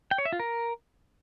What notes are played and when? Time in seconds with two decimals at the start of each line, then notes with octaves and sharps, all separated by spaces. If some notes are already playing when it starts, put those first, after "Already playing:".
0.11 G5
0.18 C#5
0.25 E5
0.33 F4
0.40 A#4